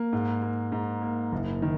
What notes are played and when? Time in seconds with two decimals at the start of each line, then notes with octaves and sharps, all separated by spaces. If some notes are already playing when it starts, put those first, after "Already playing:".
Already playing: A#3
0.13 G#2
0.42 A#3
0.72 G#2
1.02 A#3
1.32 F#1
1.62 D#3